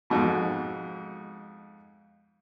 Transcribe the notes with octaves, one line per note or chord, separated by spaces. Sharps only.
F2 G#2 B2